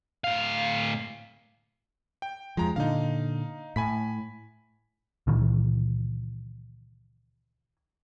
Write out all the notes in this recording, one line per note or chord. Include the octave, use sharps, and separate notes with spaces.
A2 F5
G5
F2 F3 G#3 A#5
A#2 D3 D#4 F5
A2 G#5 B5 B6
C#2 A#2 D#3 E3